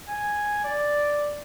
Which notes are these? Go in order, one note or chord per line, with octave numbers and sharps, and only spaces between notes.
G#5
D5